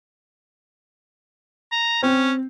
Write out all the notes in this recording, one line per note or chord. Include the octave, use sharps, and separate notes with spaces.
A#5
C4 C#4